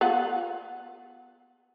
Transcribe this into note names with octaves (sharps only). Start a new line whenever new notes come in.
B3 F4 F#5